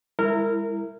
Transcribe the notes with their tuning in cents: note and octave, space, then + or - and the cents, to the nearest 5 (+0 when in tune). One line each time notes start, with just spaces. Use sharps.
G#3 -35 E4 +0 A#4 -20